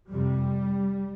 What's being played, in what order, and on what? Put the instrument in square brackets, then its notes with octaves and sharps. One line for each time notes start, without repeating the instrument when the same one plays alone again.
[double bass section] F2 C3 G3